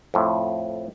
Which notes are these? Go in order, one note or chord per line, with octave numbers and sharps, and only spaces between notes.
F2 A2